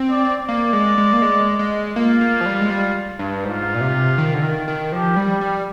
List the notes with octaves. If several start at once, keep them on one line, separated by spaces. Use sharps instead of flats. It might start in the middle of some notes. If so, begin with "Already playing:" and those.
Already playing: C4
D5
A#3 D5
G#3
G#3
A#3
G#3
G#3
A#3 F4
A#3
F3
G3
G#3
G3
G2
G#2 F4
A#2
C3
D#3
D3
D#3
D#3
F3 G4
G3
G4
G3